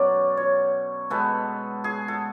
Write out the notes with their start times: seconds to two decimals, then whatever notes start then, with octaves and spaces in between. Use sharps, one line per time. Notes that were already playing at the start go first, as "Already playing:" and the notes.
Already playing: B2 F#3 C#4 D5
0.37 C#5
1.10 B2 G#3 B3 A4
1.84 G#4
2.08 A4